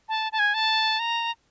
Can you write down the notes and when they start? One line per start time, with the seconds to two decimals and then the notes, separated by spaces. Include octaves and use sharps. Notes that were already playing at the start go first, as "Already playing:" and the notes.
0.09 A5
0.32 A5
0.39 G#5
0.54 A5
0.99 A#5